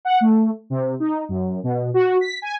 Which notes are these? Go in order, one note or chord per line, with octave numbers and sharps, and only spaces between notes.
F#5
A3
C3
D#4
F#2
B2
F#4
B6
G#5